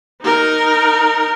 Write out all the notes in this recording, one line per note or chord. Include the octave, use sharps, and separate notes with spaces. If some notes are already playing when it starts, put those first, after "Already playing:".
D#4 A#4